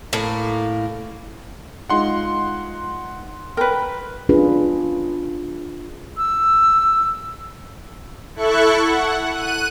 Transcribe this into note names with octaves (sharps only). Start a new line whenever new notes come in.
A2 A#3
G#3 D#4 F4 F#5 C6
A#4 B4 G5
C#4 D4 F4 G#4 B4
E6
E4 A4 C#6 F#6
F#5
F#6 D#7